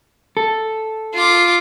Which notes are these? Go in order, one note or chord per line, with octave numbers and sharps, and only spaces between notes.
A4
F4 D6